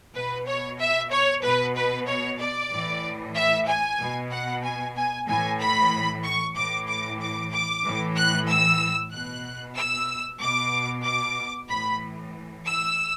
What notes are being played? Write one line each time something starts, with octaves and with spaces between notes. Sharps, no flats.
B2 B4
C#5
E5
C#5
B2 B4
B4
C#5
D5
A2 E3
E5
G#5
B2
F#5
G#5
G#5
A2 E3 G#5
B5
C#6
A2 E3 D6
D6
D6
D6
A2 E3
F#6
E6
B2 F#6
E6
B2 D6
D6
A2 E3 B5
E6